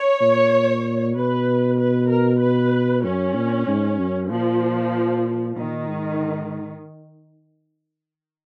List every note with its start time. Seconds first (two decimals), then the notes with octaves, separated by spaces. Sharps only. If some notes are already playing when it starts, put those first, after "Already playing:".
Already playing: C#5
0.21 A#2
1.16 B2 B4
1.79 B4
2.10 A#4
2.42 B4
3.04 F#2 C#4
3.36 A#2
3.67 G#2
3.99 F#2
4.30 A#2 F3
5.56 A#2 D#3
5.88 G#2